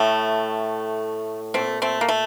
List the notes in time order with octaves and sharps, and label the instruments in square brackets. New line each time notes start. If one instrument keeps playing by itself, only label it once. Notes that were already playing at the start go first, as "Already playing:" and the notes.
Already playing: [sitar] A2 [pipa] A3
[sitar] A#2 [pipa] A3 C4
[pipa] A3 C4
A#3
A3